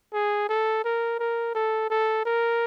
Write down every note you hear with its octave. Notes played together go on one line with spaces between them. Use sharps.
G#4
A4
A#4
A#4
A4
A4
A#4